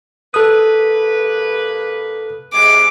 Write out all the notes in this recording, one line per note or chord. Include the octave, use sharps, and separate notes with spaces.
G2 A#3 A4 B4 D#6
C3 E3 G#3 D6